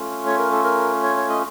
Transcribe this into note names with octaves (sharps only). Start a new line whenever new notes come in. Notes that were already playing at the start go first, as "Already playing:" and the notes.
Already playing: A3 C#4 F4
C#5
A#4
A4
A#4
C#5
C#5
D#5